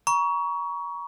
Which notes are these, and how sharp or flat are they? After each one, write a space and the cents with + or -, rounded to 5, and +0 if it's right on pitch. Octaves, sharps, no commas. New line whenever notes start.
A#5 +35 C#6 +20